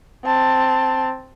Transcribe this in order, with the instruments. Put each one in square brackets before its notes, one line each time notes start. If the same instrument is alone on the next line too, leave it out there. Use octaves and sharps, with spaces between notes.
[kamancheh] C4 A5